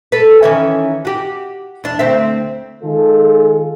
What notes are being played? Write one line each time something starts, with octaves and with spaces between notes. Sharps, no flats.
A4 B4
D#3 E3 C#4
F#4 G4
E2 D4
D2 C4 E5
D#3 G#3 F4 G#4 A4